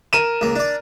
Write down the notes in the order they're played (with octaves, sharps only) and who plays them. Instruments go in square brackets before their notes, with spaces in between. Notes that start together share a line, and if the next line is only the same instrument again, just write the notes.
[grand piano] A#4 D#7 E7
[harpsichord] C#2 A#3
D4 D5